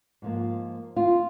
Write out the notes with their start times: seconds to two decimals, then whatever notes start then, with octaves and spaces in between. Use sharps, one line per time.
0.22 G#2 F3 A#3
0.96 F4